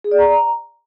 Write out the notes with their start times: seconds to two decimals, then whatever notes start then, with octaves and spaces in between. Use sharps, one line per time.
0.04 G#4
0.11 D5
0.19 A#5